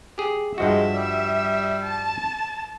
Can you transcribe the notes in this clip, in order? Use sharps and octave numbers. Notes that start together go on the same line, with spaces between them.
G4 G#4
G2 F3 G#3 F#4 E5
G3
A5